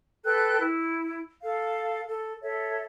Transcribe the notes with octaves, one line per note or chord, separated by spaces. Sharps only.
A4 B4 G5 F#6
E4
A4 F5
A4
A4 C#5 E5